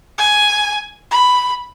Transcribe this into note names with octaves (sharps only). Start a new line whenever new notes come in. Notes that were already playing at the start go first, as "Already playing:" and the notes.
G#5
B5